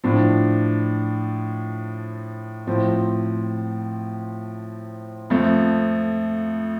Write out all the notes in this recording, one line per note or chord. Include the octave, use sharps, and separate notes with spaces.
A2 F3 D4
A2 F3 C4
F2 F3 A3